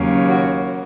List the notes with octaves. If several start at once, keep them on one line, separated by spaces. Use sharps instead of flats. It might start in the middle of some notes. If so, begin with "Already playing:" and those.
Already playing: D#2 C#3 F#3 A#3 C#4
F#4